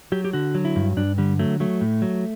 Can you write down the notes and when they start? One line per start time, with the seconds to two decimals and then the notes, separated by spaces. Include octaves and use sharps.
0.12 F#3 G4
0.25 G4
0.33 D3 F#4
0.55 F#3
0.65 E4
0.76 G2
0.97 G2 D4
1.18 D3 G3
1.39 F#3 A3
1.60 F#3 A3
1.81 A2
2.02 F#3